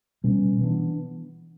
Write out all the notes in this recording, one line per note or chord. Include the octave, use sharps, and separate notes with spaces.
B2 G3 C#4
E3 B3 D4